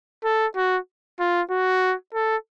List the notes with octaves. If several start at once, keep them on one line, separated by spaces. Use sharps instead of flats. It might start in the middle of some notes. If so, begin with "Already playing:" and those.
A4
F#4
F4
F#4
A4